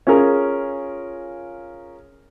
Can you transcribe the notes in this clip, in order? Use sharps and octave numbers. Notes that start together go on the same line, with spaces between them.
C#4 F4 G#4 A#4